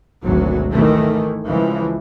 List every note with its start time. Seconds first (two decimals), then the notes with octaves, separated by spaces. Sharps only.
0.23 G#1 D2 B2 F#3
0.71 D#3 E3 A3
1.44 C#2 E3 F3